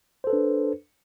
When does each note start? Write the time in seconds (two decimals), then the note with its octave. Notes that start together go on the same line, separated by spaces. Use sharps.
0.24 C5
0.27 A4
0.30 B4
0.33 D4